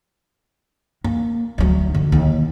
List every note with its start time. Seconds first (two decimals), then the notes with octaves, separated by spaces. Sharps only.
1.04 A#3
1.58 D2 F#3
1.95 D3
2.12 D#2